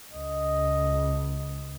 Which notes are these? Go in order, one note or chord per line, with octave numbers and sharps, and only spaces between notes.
C#2 D#5